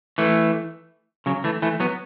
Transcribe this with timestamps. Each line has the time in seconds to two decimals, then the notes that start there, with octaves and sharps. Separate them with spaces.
0.18 E3 A3
1.26 C#3 F#3
1.44 E3 A3
1.62 E3 A3
1.80 F#3 B3